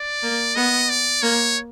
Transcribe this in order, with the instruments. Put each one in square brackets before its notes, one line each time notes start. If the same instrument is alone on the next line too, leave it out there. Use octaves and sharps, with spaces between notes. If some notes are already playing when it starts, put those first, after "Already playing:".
Already playing: [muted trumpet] D5
[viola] A#3
[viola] B3 [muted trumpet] D#5
[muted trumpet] D5
[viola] A#3 [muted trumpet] C#5